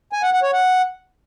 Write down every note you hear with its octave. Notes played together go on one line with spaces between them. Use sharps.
G#5
F#5
F#5
C#5
F#5